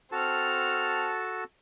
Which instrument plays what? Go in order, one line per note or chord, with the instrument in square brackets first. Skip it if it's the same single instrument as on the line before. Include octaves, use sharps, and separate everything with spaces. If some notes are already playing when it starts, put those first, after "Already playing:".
[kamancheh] C4 F6 [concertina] F#4 A4 A5